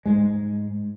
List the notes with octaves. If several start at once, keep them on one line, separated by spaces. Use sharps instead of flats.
G#2 G#3